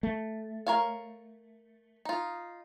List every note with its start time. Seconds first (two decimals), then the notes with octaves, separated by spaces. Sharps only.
0.03 A3
0.67 A#4 C#5 F5
2.05 D#4 F4